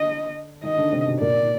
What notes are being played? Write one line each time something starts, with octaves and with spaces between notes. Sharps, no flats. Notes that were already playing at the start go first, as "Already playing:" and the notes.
Already playing: D3 D4 D#5
D#3 D#4 D#5
D3 D4
C3 C4
B2 B3
A#2 A#3 D5